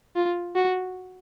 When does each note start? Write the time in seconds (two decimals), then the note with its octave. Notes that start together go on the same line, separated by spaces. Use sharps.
0.16 F4
0.56 F#4